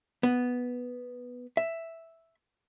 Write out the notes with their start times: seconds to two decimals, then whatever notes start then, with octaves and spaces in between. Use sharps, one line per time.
0.23 B3
1.57 E5